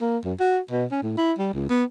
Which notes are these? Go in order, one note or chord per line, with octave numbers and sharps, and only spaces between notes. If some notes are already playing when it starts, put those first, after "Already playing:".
A#3
F#2
F#4
B2
C#4
A2
E4
G3
C#2
B3